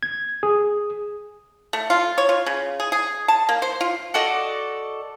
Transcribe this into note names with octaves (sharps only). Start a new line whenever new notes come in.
G#6
G#4
A3
F4
C#5
F4
C#3
G#4
G#4
A5
A#3
C5
F4
F#4 A4 D5 D#5